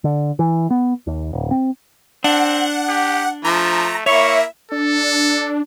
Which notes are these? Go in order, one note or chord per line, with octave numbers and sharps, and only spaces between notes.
D3
E3
B3
D#2
D1
C4
C4 D4 F#5
G4
F3 A3 A#5
A#3 E4 C#5 E5 C#6
D4 A4